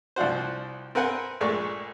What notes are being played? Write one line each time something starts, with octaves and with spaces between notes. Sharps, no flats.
C2 F3 D4 F#4 C5
C4 A#4 B4 F#5 G#5
A#1 G#3 A3 D5 C#6